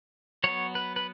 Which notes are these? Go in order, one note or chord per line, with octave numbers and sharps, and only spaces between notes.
F#3 B3 C#5
B4
B4